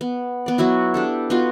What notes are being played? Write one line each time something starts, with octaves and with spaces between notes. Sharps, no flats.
B3
B3 D5
F#3 B3 E4 F#4
D4 G4 A4
B3 D#4 F4 F#4